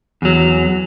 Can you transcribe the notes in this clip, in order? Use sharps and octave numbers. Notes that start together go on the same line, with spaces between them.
E2 F#3